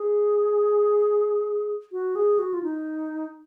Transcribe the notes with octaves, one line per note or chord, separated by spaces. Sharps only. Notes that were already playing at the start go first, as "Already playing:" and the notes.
Already playing: G#4
F#4
G#4
F#4
F4
D#4